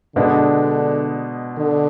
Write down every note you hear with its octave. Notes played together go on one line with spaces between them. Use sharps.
B2 D3 G#3 B3 D4
D3